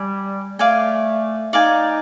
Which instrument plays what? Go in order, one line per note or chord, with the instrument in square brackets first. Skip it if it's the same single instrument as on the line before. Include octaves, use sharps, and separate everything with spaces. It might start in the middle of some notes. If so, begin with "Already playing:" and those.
Already playing: [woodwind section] G3 [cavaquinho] D5 G#5
[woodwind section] A3 [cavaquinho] D5 F5 G#5
[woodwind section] D#4 [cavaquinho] D5 F5 G#5